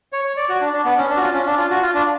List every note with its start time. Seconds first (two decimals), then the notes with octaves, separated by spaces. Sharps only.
0.13 C#5
0.25 C#5
0.37 D5
0.49 F#4
0.61 D4
0.73 D4
0.85 B3
0.98 C#4
1.10 D4
1.17 F#4
1.21 F4
1.33 C#4
1.46 D4
1.58 F4
1.70 F#4
1.82 F4
1.94 D4